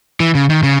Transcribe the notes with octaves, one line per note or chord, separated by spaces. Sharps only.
E3
C#3
D#3
C#3